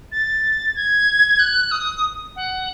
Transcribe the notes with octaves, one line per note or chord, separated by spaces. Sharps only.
A6
G#6
F#6
D#6
F#5